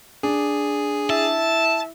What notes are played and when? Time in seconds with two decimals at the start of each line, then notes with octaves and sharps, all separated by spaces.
0.23 D4 G#4
1.10 E4 A5